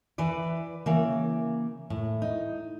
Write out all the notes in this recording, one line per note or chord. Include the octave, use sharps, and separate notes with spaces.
E3 B4 D5
C#3 E3 A#3
A2
D#4